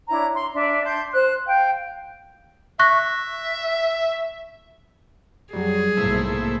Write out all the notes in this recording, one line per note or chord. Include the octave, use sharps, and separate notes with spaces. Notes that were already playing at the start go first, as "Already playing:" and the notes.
D4 E4 C#5 A#5
C6
D4 D5 E5
A5 C6 G6
C5 F#6
F5 G5
E5 C#6 F#6 A#6
F#2 F#3 G3 G#4
B1 G#2 C3 A3 A#3 E4